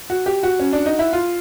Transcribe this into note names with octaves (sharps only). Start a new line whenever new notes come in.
F#4
G4
F#4
C#4
D4
D#4
E4
F4